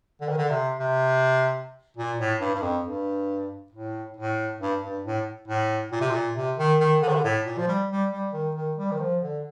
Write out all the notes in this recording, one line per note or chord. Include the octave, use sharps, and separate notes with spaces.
D3
D#3
D3
C3
C3
A#2
A2
G2
G2
F2
G2
A2
A2
G2
G2
A2
A2
A#2
C3
A#2
C3
D#3
D#3
D3
D#3
D3
A2
A#2
F3
G3
G3
G3
D#3
D#3
G3
D#3
F3
D3